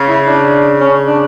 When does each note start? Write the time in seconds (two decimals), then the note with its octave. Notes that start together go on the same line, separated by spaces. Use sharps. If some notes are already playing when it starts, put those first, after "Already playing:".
Already playing: C#3
0.08 E4
0.27 D4
0.81 C#4
1.07 D4